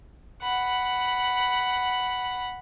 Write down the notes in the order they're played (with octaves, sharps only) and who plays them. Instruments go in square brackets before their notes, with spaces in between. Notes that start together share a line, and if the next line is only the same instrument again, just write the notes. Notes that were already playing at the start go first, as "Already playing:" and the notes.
[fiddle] F#5 B5